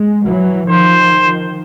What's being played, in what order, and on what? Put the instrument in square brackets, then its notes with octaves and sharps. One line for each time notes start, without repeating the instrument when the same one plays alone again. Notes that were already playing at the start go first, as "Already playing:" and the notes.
Already playing: [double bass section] G#3
E3 F#3
[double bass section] D#3 F3 [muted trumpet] C5